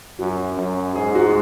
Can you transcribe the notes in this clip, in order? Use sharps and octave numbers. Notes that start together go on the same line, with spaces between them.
F#2 F#4
F#2
G#2 G#4
F#4
G#3